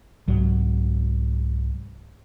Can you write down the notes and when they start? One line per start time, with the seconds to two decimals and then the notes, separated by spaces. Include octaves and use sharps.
0.28 C2 G#2 F#3